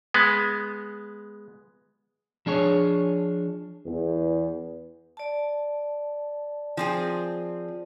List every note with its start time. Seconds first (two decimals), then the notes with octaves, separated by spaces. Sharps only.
0.14 G#3 B3
2.46 F3 D4 G#4 C#5
3.85 E2
5.17 D5 A5
6.77 F3 C4 G#4